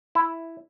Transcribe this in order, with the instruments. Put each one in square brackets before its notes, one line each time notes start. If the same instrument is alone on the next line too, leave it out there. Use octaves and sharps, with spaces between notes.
[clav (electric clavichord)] E4